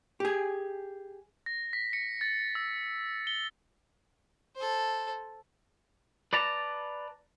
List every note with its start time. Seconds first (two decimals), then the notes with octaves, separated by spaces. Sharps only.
0.20 G4 G#4
1.46 A#6
1.73 B6
1.93 C#7
2.21 A6
2.55 E6
3.27 G7
4.56 A4 C5
6.33 B4 D5 A5 A#5